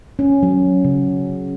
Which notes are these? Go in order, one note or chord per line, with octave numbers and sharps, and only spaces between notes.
C#4
F#3
C#3